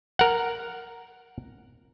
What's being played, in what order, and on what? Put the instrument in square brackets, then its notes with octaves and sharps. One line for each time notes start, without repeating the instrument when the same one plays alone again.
[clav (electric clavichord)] A#4 F#5